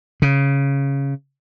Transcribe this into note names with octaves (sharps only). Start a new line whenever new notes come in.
C#3